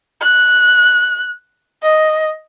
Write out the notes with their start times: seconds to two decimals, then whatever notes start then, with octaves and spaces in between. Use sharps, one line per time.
0.21 F#6
1.82 D#5